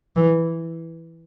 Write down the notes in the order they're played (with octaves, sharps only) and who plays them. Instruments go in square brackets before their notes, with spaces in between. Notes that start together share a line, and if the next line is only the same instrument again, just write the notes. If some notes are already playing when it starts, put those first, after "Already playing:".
[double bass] E3